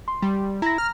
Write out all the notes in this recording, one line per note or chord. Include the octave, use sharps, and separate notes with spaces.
C6
G3
E4 A#5 A#6
F6